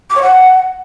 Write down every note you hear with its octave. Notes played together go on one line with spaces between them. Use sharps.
D6
C#5
F#5